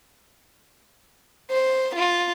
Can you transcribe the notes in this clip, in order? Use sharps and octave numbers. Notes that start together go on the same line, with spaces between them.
C5
F4